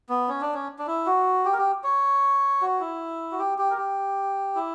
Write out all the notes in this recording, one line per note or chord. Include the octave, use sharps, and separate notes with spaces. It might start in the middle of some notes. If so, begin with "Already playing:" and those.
B3
C#4
D4
C#4
D4
E4
F#4
G4
A#4
G4
C#5
F#4
E4
F#4
G4
G4
A#4
G4
E4